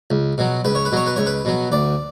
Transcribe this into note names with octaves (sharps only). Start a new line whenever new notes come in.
C#2
B2 F#3
C#2 B4
C#5
B4
B2 F#3 C#5
B4
C#2 C#5
B4
B2 F#3
D2 D5